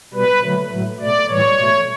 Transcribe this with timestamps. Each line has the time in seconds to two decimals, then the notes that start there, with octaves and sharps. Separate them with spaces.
0.14 B2 G3 B4
0.42 D3 F#3 A3
0.71 A2 F#3 A3
1.00 B2 A3 D5
1.29 A2 E3 G3 C#5
1.58 B2 A3